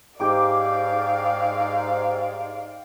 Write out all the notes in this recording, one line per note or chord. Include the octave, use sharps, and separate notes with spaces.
G#2 G4 D5 F5 D6